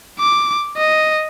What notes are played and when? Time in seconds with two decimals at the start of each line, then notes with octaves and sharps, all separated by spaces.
0.19 D6
0.77 D#5